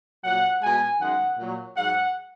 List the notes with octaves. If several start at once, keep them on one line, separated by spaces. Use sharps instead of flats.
A#2 F#3 F#5
B2 G#3 G#5
F#2 D#3 G#3 F#5
A#2 F#3
G#2 F#3 F#5